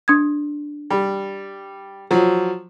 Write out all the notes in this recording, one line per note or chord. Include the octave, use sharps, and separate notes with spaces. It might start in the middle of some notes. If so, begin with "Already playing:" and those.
D4 D#6 G#6
G3
F3 F#3